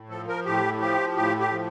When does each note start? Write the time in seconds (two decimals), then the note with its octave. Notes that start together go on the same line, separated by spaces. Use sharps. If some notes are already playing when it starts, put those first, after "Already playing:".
Already playing: A2
0.09 F3 A4
0.28 A#4
0.45 A2 G4
0.80 F3 G4
1.17 A2 G4
1.40 G4
1.51 F3